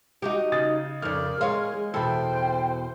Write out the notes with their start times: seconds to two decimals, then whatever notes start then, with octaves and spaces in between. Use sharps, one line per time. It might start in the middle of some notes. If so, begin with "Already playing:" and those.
0.22 D#4 F#4 G4
0.52 C#3 D#6 A6
1.02 F2 C#3 A#4 D5 F6
1.41 G#3 G#4 C#5 F5 C6
1.94 E2 B2 A4 C5 G5 B5